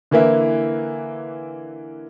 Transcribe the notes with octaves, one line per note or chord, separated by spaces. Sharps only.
D3 E3 A#3 E4